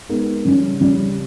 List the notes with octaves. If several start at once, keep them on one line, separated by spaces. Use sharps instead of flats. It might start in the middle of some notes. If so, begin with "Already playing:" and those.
G#3 B3 D#4 A#4
C#3 G3 C#4
C#3 G3 C#4